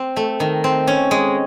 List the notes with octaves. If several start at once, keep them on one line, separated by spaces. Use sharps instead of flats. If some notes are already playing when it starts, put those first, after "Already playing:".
Already playing: C4
A3
D#3
C4
C#4
G#3